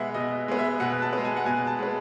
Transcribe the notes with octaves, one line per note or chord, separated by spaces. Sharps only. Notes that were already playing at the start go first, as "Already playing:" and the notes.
Already playing: B2 G#3 B3 E5 F#5
B2 D#5
G#3 B3
E5
B2 F#5
A5
B3
G#3
G#5
F#5
B2 G#5
A5
G#3 B3